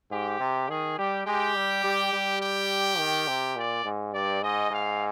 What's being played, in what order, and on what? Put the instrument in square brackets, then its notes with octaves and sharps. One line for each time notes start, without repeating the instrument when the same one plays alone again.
[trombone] G#2 [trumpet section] G4
[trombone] C3
[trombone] D#3 [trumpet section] G#4
[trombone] G3 [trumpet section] G4
[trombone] G#3 [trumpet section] G4
[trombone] G3
G3
G3
[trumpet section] G4
[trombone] D#3
C3
[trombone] A#2 [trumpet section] D5
[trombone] G#2
[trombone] G2 [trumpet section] D5
[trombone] G#2 [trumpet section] D#5
[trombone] G#2 [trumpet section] F5